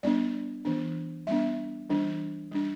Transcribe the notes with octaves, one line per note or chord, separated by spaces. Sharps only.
G3 B3 D4 D5
E3 B3 D4
G3 B3 D4 E5
E3 G3 D4
G3 D4